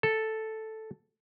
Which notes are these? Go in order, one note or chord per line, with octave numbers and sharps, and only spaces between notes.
A4